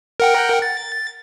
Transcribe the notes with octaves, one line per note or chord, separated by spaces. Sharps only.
A#4 F#5 G5
A6